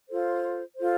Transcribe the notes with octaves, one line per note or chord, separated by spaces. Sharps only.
F4 A4 C5
F4 A4 C5